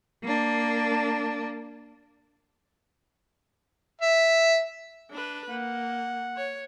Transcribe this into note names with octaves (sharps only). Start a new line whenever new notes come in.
A#3 D4
E5
D4 B4
A#3 F#5
C#5